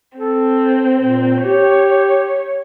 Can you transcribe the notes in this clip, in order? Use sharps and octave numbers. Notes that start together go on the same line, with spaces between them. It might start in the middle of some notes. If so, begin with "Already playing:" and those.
C4 A4
A#2
G4 C#5